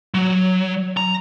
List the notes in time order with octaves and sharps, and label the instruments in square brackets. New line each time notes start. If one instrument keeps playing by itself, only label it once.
[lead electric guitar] F#3
A#5